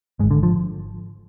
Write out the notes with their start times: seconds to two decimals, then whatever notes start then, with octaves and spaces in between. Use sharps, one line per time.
0.19 G#2 G#3
0.23 G#1
0.31 D3
0.43 F3